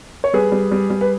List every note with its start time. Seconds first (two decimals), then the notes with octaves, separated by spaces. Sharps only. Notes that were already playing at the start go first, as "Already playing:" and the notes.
0.24 C#5
0.33 G3 G#4 B4
0.52 G3
0.71 G3
0.90 G3
1.01 B4